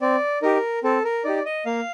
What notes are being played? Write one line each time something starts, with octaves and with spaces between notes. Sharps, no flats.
C4 D5
D#4 G4 A#4
C4 A4
A#4
D#4 G4 D5
D#5
A#3 F5